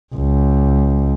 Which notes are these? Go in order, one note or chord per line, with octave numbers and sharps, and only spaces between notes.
C#2